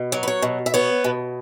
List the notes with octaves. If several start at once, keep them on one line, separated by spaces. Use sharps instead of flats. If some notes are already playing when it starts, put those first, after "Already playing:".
Already playing: B2
F#3
B4
C#5
B2
E5
B3 C#5
B2